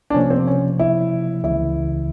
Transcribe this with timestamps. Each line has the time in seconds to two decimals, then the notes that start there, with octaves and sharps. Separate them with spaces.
0.10 D4
0.14 C3 F3 A#3 C#4
0.30 C4
0.47 C#4
0.79 E4
1.43 C#2 C#3 E3 E4